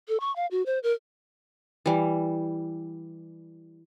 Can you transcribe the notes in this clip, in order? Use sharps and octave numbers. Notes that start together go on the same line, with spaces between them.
A4
C#6
F5
F#4
C5
A#4
E3 G3